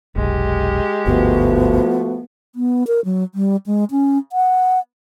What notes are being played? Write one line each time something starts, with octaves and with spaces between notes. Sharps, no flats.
F1 B1 G#3 G4
G1 D2 G#2 F3 A3 B3 F#4
B3
A#4
F#3
G3
G#3
C#4
F#5